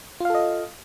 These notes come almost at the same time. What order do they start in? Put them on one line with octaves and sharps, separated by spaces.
F4 F5 A4 D#5